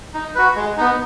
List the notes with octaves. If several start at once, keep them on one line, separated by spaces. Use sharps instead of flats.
D#4
F#4 B4
G#3
B3 D#4